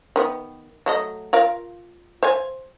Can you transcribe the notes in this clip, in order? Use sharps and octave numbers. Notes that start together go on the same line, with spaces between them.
D#3 B3
F#3 A3 D#5
F4 A#4 F5
C5 F5 G#5